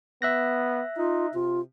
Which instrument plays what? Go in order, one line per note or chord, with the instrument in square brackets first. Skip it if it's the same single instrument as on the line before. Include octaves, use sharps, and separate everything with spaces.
[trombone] B3 [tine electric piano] E5 F#6 A#6
[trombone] D#4 [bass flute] F4
[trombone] C3 [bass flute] F4